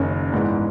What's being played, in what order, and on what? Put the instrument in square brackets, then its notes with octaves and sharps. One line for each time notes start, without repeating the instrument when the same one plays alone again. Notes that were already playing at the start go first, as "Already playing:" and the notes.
Already playing: [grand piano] F#1 F#2 D#3 [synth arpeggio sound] C#4
[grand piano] A#1 G#2 E3 G#3 B3